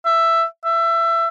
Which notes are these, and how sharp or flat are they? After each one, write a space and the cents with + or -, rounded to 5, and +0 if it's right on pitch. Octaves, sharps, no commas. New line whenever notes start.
E5 +10
E5 +20